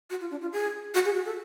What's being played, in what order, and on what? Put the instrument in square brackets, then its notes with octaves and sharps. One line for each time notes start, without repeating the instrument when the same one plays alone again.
[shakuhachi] F#4
F4
D4
F4
G#4
F#4
G#4
F#4
A4